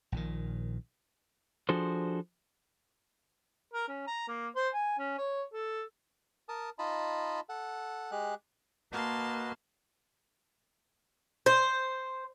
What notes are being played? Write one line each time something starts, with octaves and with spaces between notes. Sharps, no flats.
A#1 A#2 D#3
F3 D4 F#4 G#4 A4 C5
A#4
C#4
A#5
A#3
C5
G#5
C#4
C#5
A4
A#4 A5 D#6
D#4 F4 D#5 A5 B5
A4 F#5
G#3 G4 G#4 F#6
A#3 F#4 B4 D#5 A5 C6
C5